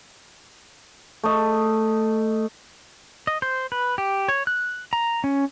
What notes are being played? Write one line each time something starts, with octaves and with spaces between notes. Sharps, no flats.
A3 D#5
D#5
C5
B4
G4
C#5
F#6
A#5
C#4